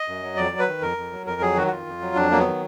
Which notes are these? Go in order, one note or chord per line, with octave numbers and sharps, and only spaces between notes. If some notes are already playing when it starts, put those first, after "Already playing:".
Already playing: D#5
F#2
F#3
F2 D5
F#3
B4
D#3
F2 A#4
F2
F#3
F2 A#4
F#3 G#4
D#3 F#4
F#4
F2 F4
F2
F#3
F2 D4
F#3 A#3
B3
D#3